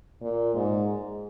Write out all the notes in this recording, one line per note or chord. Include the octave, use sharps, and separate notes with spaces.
A#2
G#2